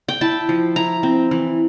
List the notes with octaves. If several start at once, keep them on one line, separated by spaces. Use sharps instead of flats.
G5
E4 A5
F3
E4 A#5
C4
E3